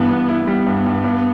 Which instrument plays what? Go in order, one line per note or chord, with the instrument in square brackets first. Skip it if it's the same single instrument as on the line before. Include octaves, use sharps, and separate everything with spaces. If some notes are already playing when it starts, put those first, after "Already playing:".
Already playing: [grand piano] G2 E3 [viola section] B3
[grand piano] G2
E4
[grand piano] G3 [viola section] B3
[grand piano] G2
G2
G2